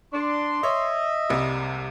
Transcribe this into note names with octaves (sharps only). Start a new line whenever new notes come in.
D4 C6
C#5 D#5 E5
C2 C3 G3 G#3 A#3 G4